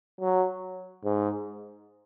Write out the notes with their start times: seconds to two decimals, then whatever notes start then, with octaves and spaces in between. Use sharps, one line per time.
0.21 F#3
1.04 G#2